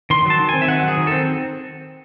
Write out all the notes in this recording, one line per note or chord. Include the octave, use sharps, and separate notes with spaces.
D#3 C6
F#3 A5
D#3
C4 G#5
E5
D#3 F#5
F#3
G#4
D#3
C4 A4